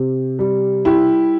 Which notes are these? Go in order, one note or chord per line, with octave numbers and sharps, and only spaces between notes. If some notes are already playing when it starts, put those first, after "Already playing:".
Already playing: C3
G3
G3 E4 G4